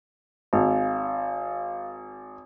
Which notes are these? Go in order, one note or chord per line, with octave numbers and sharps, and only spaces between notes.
G#1 F5